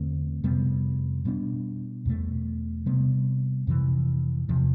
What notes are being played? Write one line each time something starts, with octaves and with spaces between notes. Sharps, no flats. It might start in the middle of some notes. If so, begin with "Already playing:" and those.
Already playing: E2 D3 A3 C4
F2 C3 G3 B3
B2 G3 B3 D4
E2 B2 A3
C3 G3 B3
F2 C3 E3
E2 C3 F3